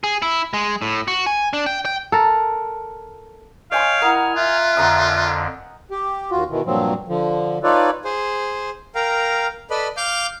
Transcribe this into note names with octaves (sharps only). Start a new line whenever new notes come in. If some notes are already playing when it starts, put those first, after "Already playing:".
G#4
E4
G#3
A2
F#4
G#5
D4
G5
G5
A4 A#4
C#5 D#5 F5 G5 G#5 C6
E4 A#4 F#5 G#5 D#6 F6
F4 E5 F#6
F2 D3 F#5 A#5 D#6
G4
D#2 F4 F#4
B2 D#3 E3
G2 A#2 F3 F#3 C4
D3 F3
D#4 F4 A4 B4 C#5 D5
G#4 C5
A#4 F5 G5 A#5
A4 B4 D5 D#5 B5
F5 D6 F6 G6